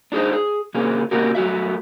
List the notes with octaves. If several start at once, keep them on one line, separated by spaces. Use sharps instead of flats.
D4 D#4 G#4 A4 C5
G#4
C3 A#3 C#4 G#4
C3 A#3 C#4 F#4 G4 A#4
F#2 A3 F#4 E5